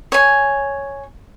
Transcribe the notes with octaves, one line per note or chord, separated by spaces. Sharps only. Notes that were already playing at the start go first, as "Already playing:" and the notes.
C#5 G#5